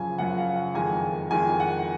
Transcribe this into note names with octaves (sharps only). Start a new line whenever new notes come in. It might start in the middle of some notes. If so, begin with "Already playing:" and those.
Already playing: F#2 C#3 F3 G#5
F#2 C#3 F3 F#5
F5
F#5
F2 D#3 G#3 G#5
F2 D#3 G#3 G#5
F#5